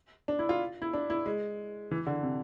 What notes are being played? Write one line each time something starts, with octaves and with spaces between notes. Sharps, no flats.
D4
E4
F4
E4
D4
E4
G#3
E3
D3
C3